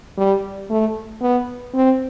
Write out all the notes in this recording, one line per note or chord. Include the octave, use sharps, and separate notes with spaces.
G3
A3
B3
C4